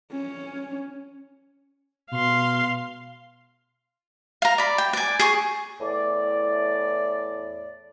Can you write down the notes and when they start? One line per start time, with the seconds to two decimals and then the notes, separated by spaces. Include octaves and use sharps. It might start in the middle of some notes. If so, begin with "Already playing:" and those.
0.12 C#4
2.11 B2 F5 C6
4.42 F5 A#5
4.58 D5 B5
4.78 G5
4.93 D5 G#5
5.19 G#4 G#5 C#6
5.81 E2 A2 D5